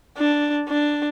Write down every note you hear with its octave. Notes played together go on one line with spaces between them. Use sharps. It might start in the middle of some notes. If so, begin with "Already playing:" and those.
D4
D4